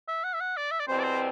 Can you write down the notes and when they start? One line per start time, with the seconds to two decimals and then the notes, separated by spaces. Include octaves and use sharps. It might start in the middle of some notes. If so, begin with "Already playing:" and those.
0.08 E5
0.24 F#5
0.34 E5
0.41 F#5
0.57 D5
0.71 E5
0.80 D5
0.87 E2 B2 G3 C4 C5
0.99 D5
1.03 C5